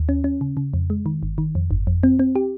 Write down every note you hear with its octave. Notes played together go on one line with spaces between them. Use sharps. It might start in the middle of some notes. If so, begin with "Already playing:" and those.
Already playing: D#2
C#4
C#4
C#3
C#3
F2
G#3
D#3
G1
D#3
F2
G1
F2
C4
C4
G4